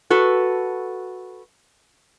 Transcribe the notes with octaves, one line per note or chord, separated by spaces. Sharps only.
F#4 A4 B4